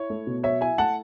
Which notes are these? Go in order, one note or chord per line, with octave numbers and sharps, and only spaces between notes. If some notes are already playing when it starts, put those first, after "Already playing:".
Already playing: E4 C#5
A3
B2
F#3 C#5 E5
E4 E5 G#5
A3 F#5 A5